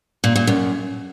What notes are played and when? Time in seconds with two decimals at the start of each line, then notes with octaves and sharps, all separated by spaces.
0.24 A#2
0.36 A#2
0.47 F#2